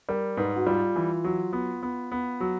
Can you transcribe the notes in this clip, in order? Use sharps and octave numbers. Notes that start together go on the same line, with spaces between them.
G3 A#4
G#2 B4
F#4
G3 F4
E3
F#3
B3
B3
B3
F#3